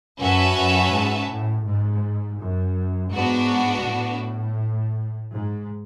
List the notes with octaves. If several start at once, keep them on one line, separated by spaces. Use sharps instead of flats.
F#2 C#4 F#4 B4 E5 A5
F#2
G#2
A2
G#2
F#2
G#2 B3 D4 F#4
A2
G#2